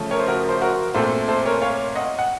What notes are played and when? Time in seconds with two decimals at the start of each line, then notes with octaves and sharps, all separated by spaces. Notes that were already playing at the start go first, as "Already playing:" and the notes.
Already playing: C#3 F3 A3 C#4
0.11 A#4 C#5
0.19 C5
0.27 F#4 A#4
0.49 C5
0.61 F#4 A#4
0.94 A#2 A3 C4 A4 C5
1.28 A4 C5
1.46 A#4 C#5
1.62 C#5 F5
1.95 D#5 F#5
2.19 F#5